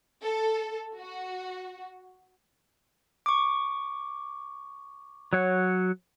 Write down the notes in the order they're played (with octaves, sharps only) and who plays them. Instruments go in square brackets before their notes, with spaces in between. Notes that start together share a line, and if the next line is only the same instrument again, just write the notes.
[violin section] A4
F#4
[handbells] C#6 D6
[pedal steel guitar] F#3 C#5 F#5